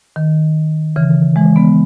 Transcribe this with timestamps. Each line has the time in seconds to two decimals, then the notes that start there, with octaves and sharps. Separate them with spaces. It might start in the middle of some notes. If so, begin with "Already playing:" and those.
0.16 D#3
0.96 C#3 E3
1.36 E3 G#3
1.56 G#3 B3